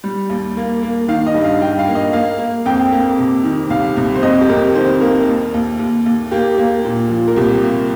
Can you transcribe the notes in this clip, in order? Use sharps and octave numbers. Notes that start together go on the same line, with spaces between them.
G3
D#2
A#3
A#3
D#3 F5
D#5
G2
F5
G2 G5
F5
A#3
D#5
A#3 F5
A#3
F2 G5
A#3
C3
D#3
C2 F5
C2
C5
F2 D#5
G4
F2 A#4
D#3 C5
A#3 A#4
D#2
D#2
D#2
D#2
A#3 G4
A#3
A#2
F3
A#4
C2 G4
A#3